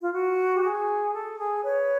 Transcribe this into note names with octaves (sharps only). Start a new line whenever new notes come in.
F4
F#4
G4
G#4
A4
G#4
B4 C#5